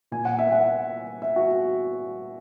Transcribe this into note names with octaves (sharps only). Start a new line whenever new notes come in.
A#2 G#5
F#5
E5
F#5
E5
F#4